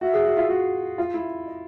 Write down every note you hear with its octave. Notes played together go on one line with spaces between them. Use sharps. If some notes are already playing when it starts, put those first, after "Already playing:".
F#4 E5
G#4
F#4
F4
F#4
F4
E4
D#5